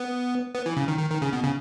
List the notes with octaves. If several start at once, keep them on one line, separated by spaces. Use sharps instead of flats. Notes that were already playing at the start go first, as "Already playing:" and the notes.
Already playing: B3
B3
E3
C#3
D#3
D#3
D#3
C#3
B2
C#3